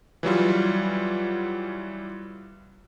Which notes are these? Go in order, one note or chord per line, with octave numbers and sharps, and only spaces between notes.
E3 F#3 G3 F4